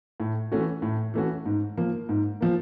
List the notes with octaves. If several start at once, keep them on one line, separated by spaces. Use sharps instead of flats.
A2
E3 A3 C#4 F#4
A2
E3 A3 C#4 F#4
G#2
F3 A#3
G#2
F3 A#3